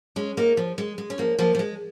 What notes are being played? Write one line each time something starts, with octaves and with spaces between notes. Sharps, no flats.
G#3 C#4
A#3 D#4
F3
G#3
G#3
C#4
F3 A#3
F3 A#3
F3
G#3